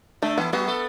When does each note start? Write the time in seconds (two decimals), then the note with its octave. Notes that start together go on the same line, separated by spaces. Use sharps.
0.22 D3 A3 D4
0.38 E3 B3 E4
0.52 F#3 B3 F#4
0.67 A3 A4